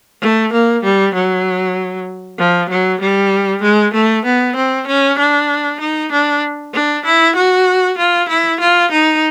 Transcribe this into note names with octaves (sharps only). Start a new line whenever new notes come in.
A3
A#3
G3
F#3
F3
F#3
G3
G#3
A3
B3
C4
C#4
D4
D#4
D4
D4
E4
F#4
F4
E4
F4
D#4